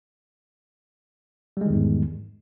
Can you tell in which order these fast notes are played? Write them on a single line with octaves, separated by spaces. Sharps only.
G3 G#3 D#3 E2 G#2